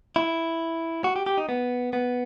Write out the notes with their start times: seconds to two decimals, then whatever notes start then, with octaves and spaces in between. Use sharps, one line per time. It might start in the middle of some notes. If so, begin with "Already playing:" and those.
0.16 E4
1.04 F#4
1.16 G4
1.26 G4
1.38 D#4
1.49 B3
1.93 B3